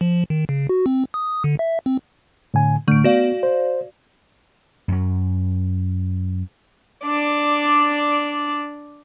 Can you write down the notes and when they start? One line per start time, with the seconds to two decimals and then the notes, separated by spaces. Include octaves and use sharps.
0.01 F3
0.30 D#3
0.49 C#3
0.69 F#4
0.86 C4
1.14 D#6
1.44 D3
1.59 E5
1.86 C4
2.54 A2 D3 G#5
2.88 A2 D3 A3 D7
3.04 B3 F#4 D5 F5
3.43 C5
4.88 F#2 F#3
7.06 D4 D5